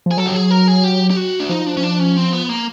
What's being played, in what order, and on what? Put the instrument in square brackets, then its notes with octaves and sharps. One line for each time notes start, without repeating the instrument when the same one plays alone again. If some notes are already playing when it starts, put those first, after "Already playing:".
[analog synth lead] F3 [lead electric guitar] G#4
[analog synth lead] F#3 [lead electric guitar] A4
[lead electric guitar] G4
G#4
A#4
G#4
G4
G4
F#4
D4
[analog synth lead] F3 [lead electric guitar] D#4
[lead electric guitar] D4
C#4
D4
C#4
C4
B3
A#3